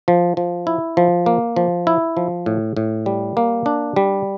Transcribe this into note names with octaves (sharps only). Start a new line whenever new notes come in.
F3
F3
E4
F3
A#3
F3
E4
F3
A2
A2
G3
A#3
D4
G3